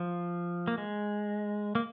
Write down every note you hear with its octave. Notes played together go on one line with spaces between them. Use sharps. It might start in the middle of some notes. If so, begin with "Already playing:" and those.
Already playing: F3
A#3
G#3
A#3